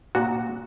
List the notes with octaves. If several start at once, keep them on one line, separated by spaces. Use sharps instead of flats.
A#2 F#4